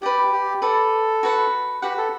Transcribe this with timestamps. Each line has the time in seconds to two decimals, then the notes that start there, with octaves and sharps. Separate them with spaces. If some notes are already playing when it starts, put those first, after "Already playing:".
0.02 G4 B4 D5 F#5
0.32 G4
0.62 A4 B4 D5 F#5
1.23 F#4 B4 F#5
1.82 F#4 G4 B4 F#5
1.98 A4